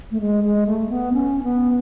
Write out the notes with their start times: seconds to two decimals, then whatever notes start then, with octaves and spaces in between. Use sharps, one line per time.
0.11 A3
0.21 G#3
0.44 G#3
0.67 A3
0.89 B3
1.13 C#4
1.43 B3